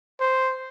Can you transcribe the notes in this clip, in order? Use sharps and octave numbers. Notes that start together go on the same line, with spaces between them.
C5